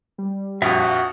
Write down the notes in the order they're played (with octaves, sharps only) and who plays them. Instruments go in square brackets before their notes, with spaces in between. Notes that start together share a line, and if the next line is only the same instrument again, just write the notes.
[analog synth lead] G3
[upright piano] A#1 F2 [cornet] F#4 [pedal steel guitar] E5 F5 D#6